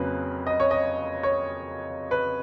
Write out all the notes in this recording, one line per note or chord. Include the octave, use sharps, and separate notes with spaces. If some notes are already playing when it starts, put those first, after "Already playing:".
Already playing: F2 C#3 F#3 A#3 B4
D#5
C#5
D#5
C#5
B4